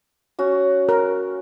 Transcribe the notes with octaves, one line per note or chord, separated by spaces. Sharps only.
C#4 F#4
A#4